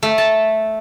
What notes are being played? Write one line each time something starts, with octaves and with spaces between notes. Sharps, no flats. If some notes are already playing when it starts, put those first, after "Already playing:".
A3
A5